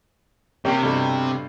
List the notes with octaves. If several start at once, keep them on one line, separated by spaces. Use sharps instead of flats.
C3 A#3 C#4 G4
G2 B2 A3